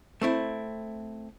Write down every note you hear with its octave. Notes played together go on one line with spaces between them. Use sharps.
A3 C4 E4